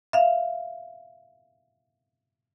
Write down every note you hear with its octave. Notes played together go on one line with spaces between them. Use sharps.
E5 F5